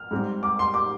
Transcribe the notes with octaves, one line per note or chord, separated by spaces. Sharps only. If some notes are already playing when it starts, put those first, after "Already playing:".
Already playing: F6
G#2 G3 C4
D6
C6
D6